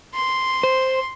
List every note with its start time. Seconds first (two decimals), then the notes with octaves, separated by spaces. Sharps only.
0.14 C6
0.63 C5